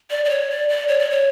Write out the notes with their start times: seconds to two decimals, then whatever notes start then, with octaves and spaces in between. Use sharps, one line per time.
0.11 D5
0.25 D5
0.30 C#5
0.50 D5
0.69 D5
0.88 C#5
0.99 D5
1.10 C#5